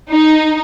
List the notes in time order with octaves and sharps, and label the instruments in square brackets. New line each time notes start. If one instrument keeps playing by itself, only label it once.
[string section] D#4